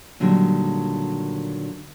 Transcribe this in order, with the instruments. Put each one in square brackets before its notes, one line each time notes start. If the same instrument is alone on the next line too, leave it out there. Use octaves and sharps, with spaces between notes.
[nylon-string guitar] A#2 D3 D#3 F#3 G3